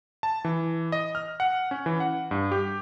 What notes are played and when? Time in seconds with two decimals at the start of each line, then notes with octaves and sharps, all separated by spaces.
0.23 A5
0.45 E3
0.92 D#5
1.15 F6
1.40 F#5
1.71 C#4
1.86 E3
2.00 F#5
2.31 G2
2.51 G4